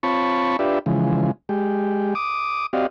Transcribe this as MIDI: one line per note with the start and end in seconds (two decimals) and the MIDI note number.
0.03 0.57 60
0.03 0.57 65
0.03 0.57 73
0.03 0.57 81
0.03 0.57 83
0.03 0.57 85
0.59 0.79 62
0.59 0.79 65
0.59 0.79 67
0.59 0.79 71
0.59 0.79 74
0.59 0.79 76
0.86 1.31 49
0.86 1.31 52
0.86 1.31 53
0.86 1.31 56
1.49 2.14 56
1.49 2.14 67
2.15 2.66 86
2.15 2.66 87
2.73 2.87 60
2.73 2.87 66
2.73 2.87 67
2.73 2.87 74
2.73 2.87 75
2.73 2.87 77